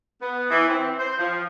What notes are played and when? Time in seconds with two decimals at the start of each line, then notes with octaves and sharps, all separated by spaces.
0.22 B3
0.50 E3
0.68 C4
0.99 C5
1.19 F3